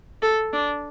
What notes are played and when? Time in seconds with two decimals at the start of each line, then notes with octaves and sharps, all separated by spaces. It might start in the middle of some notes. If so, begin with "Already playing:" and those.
0.22 A4
0.53 D4